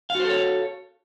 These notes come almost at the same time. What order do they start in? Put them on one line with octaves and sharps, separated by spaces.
F5 F#4 C5 A4 C#5